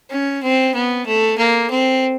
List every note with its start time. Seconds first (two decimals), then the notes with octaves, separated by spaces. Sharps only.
0.11 C#4
0.43 C4
0.75 B3
1.06 A3
1.38 A#3
1.70 C4